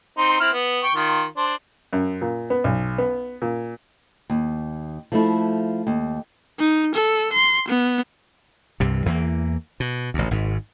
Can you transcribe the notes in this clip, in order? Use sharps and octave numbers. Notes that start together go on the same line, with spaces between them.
C4 D#4 C6
C4 E4 F6
B3
G5 C#6
D#3 F4
D4 C5
F#2
A#2
B3
B1
B3
A#2
D#2
F3 A3 E4
D#2
D#4
A4
C6
B3
C2 G2 C3
E2 E3 F#3 A#3
B2
A1 D2
G#1 G#2